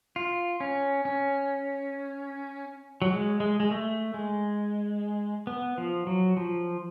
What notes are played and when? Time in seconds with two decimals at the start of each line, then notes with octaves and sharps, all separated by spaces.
0.16 F4
0.60 C#4
1.05 C#4
3.02 F#3
3.11 G#3
3.40 G#3
3.60 G#3
3.71 A3
4.14 G#3
5.47 B3
5.78 F3
6.07 F#3
6.37 F3